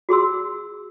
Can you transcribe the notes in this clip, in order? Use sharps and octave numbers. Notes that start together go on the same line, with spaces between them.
F#4 G#4 C6 E6